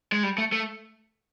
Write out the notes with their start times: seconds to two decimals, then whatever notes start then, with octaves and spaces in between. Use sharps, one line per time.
0.12 G#3
0.23 G3
0.38 A3
0.52 A3